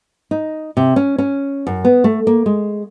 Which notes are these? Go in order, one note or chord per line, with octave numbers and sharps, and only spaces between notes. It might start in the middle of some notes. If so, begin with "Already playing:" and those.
D#4
C3
C#4
C#4
F#2
B3
A3
A#3
G#3